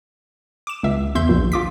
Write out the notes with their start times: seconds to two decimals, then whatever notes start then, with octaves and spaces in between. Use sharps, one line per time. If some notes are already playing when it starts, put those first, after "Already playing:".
0.67 D6 E7
0.83 C#2 E5
1.15 E2 E5 C6 G6
1.29 A#1 D#2 A#2
1.52 F4 D6 B6